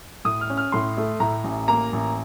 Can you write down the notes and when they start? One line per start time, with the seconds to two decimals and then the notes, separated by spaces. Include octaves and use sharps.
0.25 A2 D#6
0.41 F6
0.50 C#4
0.57 F6
0.72 A2 C6
0.97 A3
1.20 A2 A#5
1.44 A1
1.68 A#3 A#5
1.93 A1